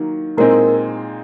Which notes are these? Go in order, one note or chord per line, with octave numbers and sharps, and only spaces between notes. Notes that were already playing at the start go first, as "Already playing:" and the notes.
Already playing: D#3 F#3 A#3
A#2 G#3 C4 D#4 A#4